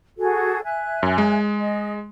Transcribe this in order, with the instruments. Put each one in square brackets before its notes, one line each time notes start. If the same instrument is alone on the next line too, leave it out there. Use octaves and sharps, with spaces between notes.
[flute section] F#4 G#4 A4
E5 G#5 F#6
[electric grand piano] F#2
G#3
[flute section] D#5